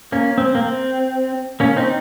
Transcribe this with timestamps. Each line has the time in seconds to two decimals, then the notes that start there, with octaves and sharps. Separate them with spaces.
0.12 A#3 C#4
0.38 C4
0.55 A#3
0.62 C4
1.60 A#3 C#4
1.76 C4 D#4